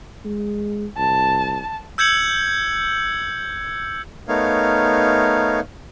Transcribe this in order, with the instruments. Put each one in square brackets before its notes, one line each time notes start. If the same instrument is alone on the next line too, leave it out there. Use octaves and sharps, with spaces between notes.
[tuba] G#3
[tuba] C2 [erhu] A5
[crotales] E6 G6 G#6 C#7 F#7
[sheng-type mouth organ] A3 B3 D#4 A#4 C#5 F5